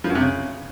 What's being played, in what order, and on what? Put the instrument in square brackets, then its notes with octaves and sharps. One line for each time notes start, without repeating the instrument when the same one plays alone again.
[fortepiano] F3
F#2
C3
C#3